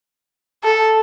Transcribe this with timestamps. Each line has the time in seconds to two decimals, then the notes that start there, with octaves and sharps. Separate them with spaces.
0.64 A4